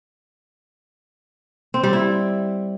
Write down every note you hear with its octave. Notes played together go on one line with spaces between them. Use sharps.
C4
G3
E4